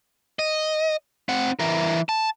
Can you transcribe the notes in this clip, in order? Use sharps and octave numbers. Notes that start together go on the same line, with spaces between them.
D#5
C4 F#5
E3 A#4
A5